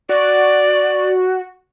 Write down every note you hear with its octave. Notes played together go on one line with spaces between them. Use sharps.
F#4 D5